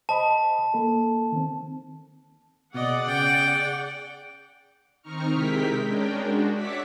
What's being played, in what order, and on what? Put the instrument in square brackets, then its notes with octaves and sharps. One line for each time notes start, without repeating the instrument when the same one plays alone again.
[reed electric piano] C5 D#5 B5 [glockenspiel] A5
[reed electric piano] A#3 A4
D#3 C4
[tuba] B2 [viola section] G#4 D5 F#5 [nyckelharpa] D#5
[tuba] C#3 [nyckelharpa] G5
[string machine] D#3 C4 D#4 A#5 C#6 F6
C3 G#3 E4 A#4 G5 B6
G#3 C#4 D4 A#4 G5
G#3 D4 F#4
C#5 D5 E5 F#5 D6 B6